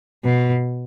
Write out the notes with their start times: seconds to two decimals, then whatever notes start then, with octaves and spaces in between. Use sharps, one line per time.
0.24 B2